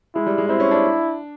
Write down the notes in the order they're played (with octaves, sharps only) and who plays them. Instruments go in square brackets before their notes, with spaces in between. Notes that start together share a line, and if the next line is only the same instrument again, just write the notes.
[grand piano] G#3 [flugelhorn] E4
[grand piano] G3
G#3
[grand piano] C4 [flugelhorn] E4
[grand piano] C#4
D4